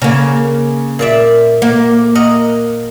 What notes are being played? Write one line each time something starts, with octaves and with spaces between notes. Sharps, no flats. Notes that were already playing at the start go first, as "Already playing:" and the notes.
C#3 A#3 A#4
A#2 D5 E5
A#3
A#4 D#5 F#5